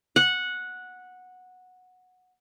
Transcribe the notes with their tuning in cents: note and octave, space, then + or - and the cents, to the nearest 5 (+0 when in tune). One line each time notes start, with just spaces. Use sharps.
F#5 -10